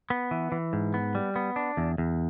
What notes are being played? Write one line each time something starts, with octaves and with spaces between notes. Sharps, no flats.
B3
E3
E3
G#2
B3
G3
B3
D4
E2
E2